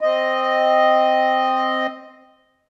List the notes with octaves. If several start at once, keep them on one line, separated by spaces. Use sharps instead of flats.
C4 D#5